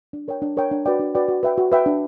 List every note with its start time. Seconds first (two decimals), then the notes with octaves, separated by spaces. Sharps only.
0.13 D4
0.28 A#4 C#5 G5
0.42 D4
0.57 A#4 C#5 G5
0.71 D4
0.86 F#4 B4 D5 G5
1.00 D4
1.15 F#4 B4 D5 G5
1.28 F#4
1.43 B4 E5 G5
1.58 F#4
1.72 B4 E5 G5
1.86 D4